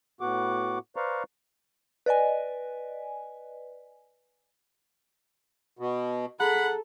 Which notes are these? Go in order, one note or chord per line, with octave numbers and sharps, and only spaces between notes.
A2 B3 F#4 F#5 D6
B4 C5 D5 F5 A#5 C#6
B4 D5 D#5 G#5
B2
G#4 A4 F#5 A#5 B5